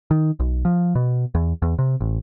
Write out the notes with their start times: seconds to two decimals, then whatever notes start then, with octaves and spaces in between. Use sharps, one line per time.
0.11 D#3
0.40 B1
0.65 F3
0.95 B2
1.35 E2
1.62 E2
1.79 C3
2.01 A1